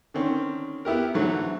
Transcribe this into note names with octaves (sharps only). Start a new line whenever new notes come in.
D3 D#3 C4 C#4
B3 E4 G4 A#4
G#2 D3 E3 F#3 A3